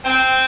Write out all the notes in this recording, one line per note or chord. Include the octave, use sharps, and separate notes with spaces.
C4